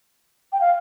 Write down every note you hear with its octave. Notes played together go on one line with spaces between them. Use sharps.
G5
F5